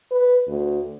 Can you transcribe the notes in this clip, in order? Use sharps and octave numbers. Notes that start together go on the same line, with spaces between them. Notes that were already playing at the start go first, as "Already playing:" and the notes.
B4
D2